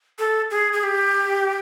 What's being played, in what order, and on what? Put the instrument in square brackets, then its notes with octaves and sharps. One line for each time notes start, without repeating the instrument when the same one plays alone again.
[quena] A4
G#4
G#4
G4